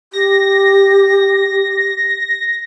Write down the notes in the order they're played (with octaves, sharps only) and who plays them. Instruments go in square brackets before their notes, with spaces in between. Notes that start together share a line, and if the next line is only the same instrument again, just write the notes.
[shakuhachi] G4 [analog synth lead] A#6